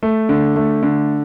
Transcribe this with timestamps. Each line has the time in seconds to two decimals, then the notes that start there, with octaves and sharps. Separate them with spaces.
0.03 A3
0.29 D3
0.56 A3
0.83 D3